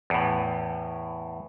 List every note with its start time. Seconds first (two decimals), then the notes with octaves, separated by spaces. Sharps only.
0.10 E2 A2